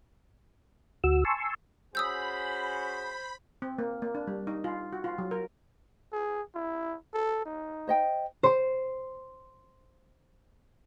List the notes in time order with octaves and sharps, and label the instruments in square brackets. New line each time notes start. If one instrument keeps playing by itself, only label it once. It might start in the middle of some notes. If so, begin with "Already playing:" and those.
[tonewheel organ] D2 F#4 E6
G#5 A5 C6 C#6 E6
[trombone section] C#4 F#4 G#4 [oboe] C5 [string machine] B5 [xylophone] D#6 E6 G6
[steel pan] C4
A#3
A#3
D4
G3
D#4
F4
F#4
F4
F#3
A#4
[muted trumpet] G#4
E4
A4
D#4
[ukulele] C5 D#5 G5
[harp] C5 C6